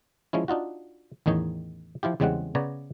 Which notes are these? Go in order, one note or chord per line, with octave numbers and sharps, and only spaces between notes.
F3 G#3 C#4 E4
D4 D#4 F4 F#4
A1 E2 D#3 D#4 C#5
F3 E4 F4 G4
E2 C#3 G3 G#3 C4 F#5
C#3 B3 B4 C#5 D5 A#5